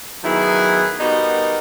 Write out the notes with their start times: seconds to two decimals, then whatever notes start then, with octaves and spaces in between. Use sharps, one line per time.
0.24 D#3 F#3 B3 E4 G#4
0.99 G3 B3 D#4 F#4 A#4